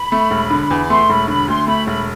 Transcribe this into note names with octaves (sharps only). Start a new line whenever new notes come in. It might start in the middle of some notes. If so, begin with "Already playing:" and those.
Already playing: B5
A3
E1
D3
E2
A3 C6
E1 B5
D3 B5
D2 C6
A3 B5
E1 B5